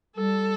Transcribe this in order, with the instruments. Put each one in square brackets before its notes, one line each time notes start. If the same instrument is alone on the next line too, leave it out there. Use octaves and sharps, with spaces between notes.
[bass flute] G3 [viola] A4